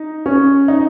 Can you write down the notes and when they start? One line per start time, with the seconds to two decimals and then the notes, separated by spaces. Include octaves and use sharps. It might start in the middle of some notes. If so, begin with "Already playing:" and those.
Already playing: D#4
0.26 C#4
0.68 D#4